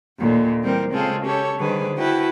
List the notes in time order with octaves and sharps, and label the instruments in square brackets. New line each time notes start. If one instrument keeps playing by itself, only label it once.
[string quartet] D#2 A#2 D3
E3 G3 C4 A#4
C#3 G#3 C4 F4 G#4 A4
C#4 G4 A4 C#5
D3 D#3 G3 G#4 B4 C5
E4 F#4 B4 G5 A5